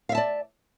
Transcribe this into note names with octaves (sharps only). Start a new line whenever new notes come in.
D5 E5 F5 A5